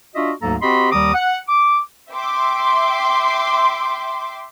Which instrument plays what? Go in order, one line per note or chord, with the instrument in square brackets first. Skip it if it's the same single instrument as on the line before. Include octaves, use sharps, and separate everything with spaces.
[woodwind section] D4 F4 F#4 D#5 E5
D2 G#2 F#3 A#3 A4 A#5
C4 F#4 G4 D#5 B5 C6
D#2 D#3 G3 A#5 D6 D#6
F#5
D6
[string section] E5 G5 C6 D6